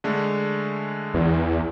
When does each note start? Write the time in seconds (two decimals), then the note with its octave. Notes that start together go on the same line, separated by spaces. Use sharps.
0.04 D3 G#3 A3
1.14 E2